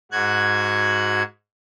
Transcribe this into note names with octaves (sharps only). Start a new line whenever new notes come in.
G#2 F#4 F#6 G#6